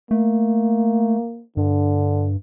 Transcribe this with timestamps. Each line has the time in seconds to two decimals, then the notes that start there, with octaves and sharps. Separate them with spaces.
0.11 A3 A#3
1.57 G2 D3